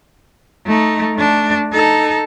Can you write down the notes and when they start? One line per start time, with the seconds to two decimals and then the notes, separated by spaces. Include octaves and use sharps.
0.66 A3 D#4
1.15 A3 D4
1.73 D#4 A4